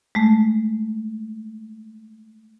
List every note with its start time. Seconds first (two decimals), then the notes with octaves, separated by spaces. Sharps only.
0.15 G#3 A3